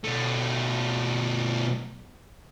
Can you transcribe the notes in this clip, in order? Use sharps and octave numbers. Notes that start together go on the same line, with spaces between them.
B2 A3